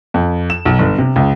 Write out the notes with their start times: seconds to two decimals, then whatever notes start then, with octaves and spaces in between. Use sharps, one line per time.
0.14 F2
0.50 E7
0.65 B1
0.79 G1
0.98 C3
1.16 C#2